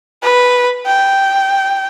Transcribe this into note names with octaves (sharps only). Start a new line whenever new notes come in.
B4
G5